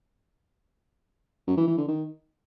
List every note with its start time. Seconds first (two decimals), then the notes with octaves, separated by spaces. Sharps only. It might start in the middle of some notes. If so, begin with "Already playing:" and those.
1.47 F#2
1.58 E3
1.68 E3
1.78 D3
1.88 D#3